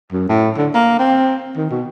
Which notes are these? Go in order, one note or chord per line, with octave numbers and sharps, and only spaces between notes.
F#2
A2
D3
A#3
C4
D#3
B2